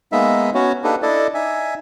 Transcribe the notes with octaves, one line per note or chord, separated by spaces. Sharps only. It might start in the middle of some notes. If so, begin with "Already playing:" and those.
G#3 A#3 B3 D#4 E5
B3 C#4 F#4 C#5
A#3 D4 D#4 G4 A4 B4
D4 E4 A4 D5 D#5
D#4 E5 G#5